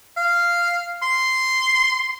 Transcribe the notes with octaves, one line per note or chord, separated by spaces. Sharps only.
F5
C6